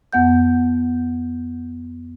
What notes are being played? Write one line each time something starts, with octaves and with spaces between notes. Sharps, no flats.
F2 B3 F#5 G6